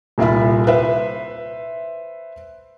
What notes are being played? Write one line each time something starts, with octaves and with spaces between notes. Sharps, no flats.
D#1 C2 F4 E5 B5
B4 C5 E5